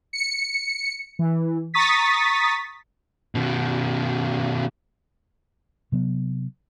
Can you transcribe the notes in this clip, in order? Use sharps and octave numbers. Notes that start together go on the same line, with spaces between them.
C#7
E3
A#5 C#6 D#6 A6 B6
B2 D#3
C3 F#3 B3